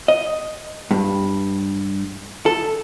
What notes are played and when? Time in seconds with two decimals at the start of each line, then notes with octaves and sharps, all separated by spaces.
0.08 D#5
0.91 G2
2.46 A4